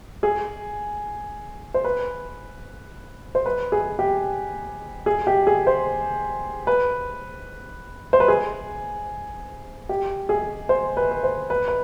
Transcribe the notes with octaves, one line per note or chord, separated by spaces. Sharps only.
G#4
C5
B4
C5
B4
G#4
G4
G#4
G4
G#4
C5
B4
C5
B4
G#4
G4
G#4
C5
B4
B4
C5
B4
B4